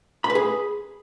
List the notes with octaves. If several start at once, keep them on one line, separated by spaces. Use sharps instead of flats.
B5
B4
G#4